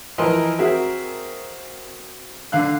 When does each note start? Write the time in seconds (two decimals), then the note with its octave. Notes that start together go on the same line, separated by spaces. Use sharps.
0.18 E3 F3 A#4 D#5 C6 F6
0.59 C4 F#4 G#4 A#4 E5
2.52 D3 F5 F#6